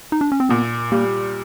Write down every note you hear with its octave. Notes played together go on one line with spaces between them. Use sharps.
D#4
D4
C#4
C4
A#2 B3
G3 A#3